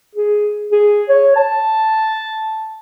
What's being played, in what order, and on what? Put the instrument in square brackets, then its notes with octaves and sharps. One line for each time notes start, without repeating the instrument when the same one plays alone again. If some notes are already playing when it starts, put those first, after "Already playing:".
[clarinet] G#4
G#4
C#5
A5